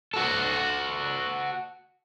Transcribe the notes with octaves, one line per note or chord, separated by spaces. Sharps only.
F#4 A4